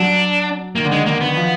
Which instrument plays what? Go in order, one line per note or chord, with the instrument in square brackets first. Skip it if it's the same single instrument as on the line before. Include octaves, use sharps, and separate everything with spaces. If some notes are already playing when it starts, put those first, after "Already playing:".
Already playing: [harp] F#3 [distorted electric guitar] D4
[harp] D#3 [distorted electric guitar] A#3
[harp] D3
[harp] D#3 [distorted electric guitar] G#3
[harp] D3 [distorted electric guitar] A#3
[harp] D#3 [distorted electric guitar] B3
[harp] F3